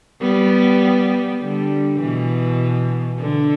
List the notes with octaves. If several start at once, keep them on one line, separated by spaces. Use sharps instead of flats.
G3 B3
D3 G3
B2 E3
D3